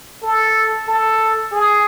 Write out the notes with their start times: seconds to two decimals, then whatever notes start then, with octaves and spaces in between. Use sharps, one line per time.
0.23 A4
0.88 A4
1.52 G#4